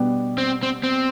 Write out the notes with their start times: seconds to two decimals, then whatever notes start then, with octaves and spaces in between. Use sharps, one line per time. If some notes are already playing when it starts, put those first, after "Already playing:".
Already playing: B2 G3 B3 D4 G4
0.38 C4
0.63 C4
0.83 C4